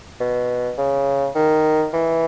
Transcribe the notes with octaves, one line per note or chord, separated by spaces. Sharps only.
B2
C#3
D#3
E3